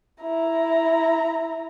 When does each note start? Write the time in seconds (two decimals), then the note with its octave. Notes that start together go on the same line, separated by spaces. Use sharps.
0.22 E4 A#5